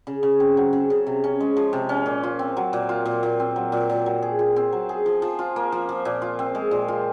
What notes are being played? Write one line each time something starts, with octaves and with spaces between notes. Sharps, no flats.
C#3
C#3
C4
F#3
C#3
C#3
C3
C#4
G#3
F3
C3
C#4
A#2
F4
C4
F#3
A#2
F4
A#2
A#2
C4
F#3
A#2
A#2
F#3
G#4
F4
C4
F#3
G#4
F3
F3
F4
A#3
F3
F3
A#2
F4
C4
G#3
A#2
F4